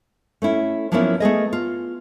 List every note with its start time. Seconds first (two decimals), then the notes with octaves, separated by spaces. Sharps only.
0.42 A3 C#4 E4
0.92 F3 F#3 A#3 B3 C#4 E4
1.20 A3 B3 G#4 D#5
1.53 F4